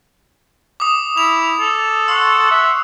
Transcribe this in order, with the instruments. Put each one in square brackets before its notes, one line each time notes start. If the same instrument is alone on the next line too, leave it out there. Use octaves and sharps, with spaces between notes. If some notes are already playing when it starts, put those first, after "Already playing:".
[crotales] D6 D#6
[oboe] E4 [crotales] F7
[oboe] A4
[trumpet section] F#5 C6 C#6 [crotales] E6
[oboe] E5